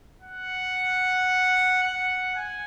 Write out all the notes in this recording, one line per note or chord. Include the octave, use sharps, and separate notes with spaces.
F#5
F#5
G#5